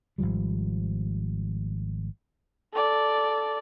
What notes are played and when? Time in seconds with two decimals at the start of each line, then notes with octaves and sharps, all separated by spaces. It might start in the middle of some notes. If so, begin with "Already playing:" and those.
0.18 G#1 C#2 F3 G3
2.74 A4 D5